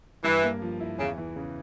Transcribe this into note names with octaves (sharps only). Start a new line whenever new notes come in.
G2 E3
A#3
F3
E4
E2 C#3
E3
C#3